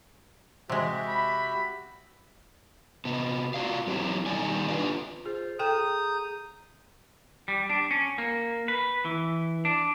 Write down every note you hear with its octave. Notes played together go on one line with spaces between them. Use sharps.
C3 G#3 F#4 G4 E5
B5
C3 B3
F4 F#4 D5 F5
F#3 C4 E4 G4 C#5
B2 D#3 G3 G4 D5 G#5
D4 F4 G4 B4 D5
F4 G#4 C5
G#4 A4 G5 A#5 D#6 G6
G3
D4
C#4
A#3
B4
E3
D4